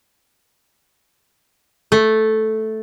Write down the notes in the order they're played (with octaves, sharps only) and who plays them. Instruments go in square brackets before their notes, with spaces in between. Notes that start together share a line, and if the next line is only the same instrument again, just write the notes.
[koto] A3